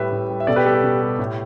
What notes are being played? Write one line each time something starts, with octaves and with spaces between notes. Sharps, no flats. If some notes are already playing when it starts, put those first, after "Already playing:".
Already playing: A2 G3 B4 E5
A2
G3
E5
B2 A4 D5
G4 B4
G3 A4
G4
B2
G3
A2